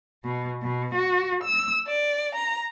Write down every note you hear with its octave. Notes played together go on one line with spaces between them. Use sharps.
B2
B2
F#4
E6
D5
A#5